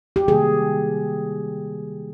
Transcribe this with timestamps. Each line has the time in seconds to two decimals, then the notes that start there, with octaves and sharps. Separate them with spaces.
0.16 G4
0.28 C3 D#3 G3 A#3 G#4